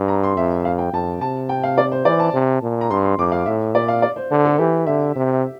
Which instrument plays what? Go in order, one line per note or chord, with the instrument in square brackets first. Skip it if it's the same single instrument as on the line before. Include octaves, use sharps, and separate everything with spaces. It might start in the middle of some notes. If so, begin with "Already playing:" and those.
Already playing: [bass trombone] G2
[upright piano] A#5
C6
[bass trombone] F2 [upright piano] E5
[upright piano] F5
G5
[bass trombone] F2 [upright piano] A5
[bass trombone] C3 [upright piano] A5
[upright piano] G5
F5
D5
C5
[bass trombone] E3 [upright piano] D5
[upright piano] A5
[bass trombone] C3
A#2
[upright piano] A#5
[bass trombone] G2 [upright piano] C6
[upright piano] C6
[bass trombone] F2 [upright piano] D6
[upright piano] F5
[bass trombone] A2 [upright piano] E5
[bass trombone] A#2 [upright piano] D5
[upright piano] F5
D5
C5
[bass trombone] D3 [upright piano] A4
[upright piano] A4
[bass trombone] E3 [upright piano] G4
[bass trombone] D3 [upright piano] E5
[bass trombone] C3